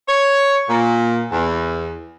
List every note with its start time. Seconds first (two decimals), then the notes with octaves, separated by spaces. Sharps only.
0.09 C#5
0.69 A#2
1.32 E2